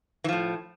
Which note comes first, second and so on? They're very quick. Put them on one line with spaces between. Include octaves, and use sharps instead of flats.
E3 F3 A2